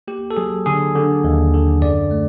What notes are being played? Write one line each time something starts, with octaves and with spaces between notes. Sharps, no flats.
A#3 G4
A4
F#3 G#4
D3 G#4
D3
D#2
D3
F#2 D5
A3